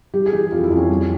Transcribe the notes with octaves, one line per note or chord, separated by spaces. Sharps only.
G3 G4
G#4
E3 G4
F2 F4
E4
F2
C#4
G3